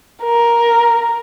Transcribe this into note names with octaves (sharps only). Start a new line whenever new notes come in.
A#4